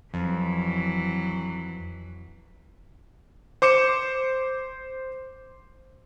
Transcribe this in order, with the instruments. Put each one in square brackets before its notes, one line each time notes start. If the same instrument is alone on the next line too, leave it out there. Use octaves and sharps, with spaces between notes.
[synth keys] F2 [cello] E3 F#3
[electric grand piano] C5 D6 C#7 E7